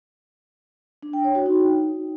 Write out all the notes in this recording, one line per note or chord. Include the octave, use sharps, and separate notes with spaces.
D4
G5
C#5
F#4
D#4